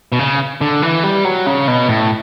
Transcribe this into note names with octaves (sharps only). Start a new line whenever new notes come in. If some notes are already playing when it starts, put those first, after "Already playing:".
B2
C#3
D3
E3
G3
F#3
C#3
B2
A2